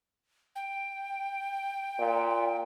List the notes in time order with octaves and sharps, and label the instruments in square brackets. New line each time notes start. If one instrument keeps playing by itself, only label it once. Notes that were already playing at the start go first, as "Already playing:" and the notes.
[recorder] G5
[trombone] A#2